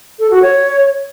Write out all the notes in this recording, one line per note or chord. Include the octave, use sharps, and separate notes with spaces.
A4
F#4
C#5